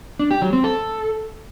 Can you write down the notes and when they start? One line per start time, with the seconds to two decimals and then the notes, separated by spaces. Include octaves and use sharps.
0.19 D4
0.31 G4
0.42 F#3
0.53 C4
0.64 A4